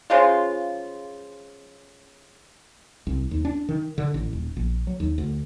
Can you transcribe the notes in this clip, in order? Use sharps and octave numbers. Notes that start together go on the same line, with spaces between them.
C#3 F3 G#3 F4
C2
D#2
D4
D#3
D3
A1
D#1
A#1
F#3
D#2
D2